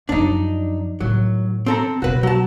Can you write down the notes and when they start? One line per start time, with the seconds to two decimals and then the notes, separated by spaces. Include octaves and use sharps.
0.09 F#2 F3 D4 D#4
1.00 A2 D#3 F#3
1.66 C4 A4 A#5
2.02 B2 B3 F#4 B4
2.23 F#3 A5